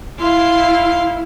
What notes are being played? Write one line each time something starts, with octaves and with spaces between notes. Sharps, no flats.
E4 F5 C6